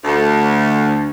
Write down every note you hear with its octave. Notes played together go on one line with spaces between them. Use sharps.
D2